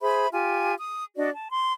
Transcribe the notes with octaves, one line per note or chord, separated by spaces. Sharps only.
G#4 C5 E5 B5
F4 G4 G#5
D#6
D4 F#4 D5 D#5
A5
C6